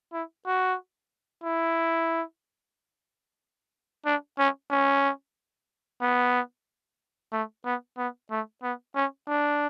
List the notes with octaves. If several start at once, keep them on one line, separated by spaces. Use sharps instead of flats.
E4
F#4
E4
D4
C#4
C#4
B3
A3
B3
B3
A3
B3
C#4
D4